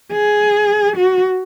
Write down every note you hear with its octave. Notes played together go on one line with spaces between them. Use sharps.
G#4
F#4